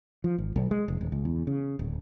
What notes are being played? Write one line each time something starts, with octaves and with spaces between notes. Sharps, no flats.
F3
G#1
B1
G#3
F1
D#1
C#2
E2
C#3
D1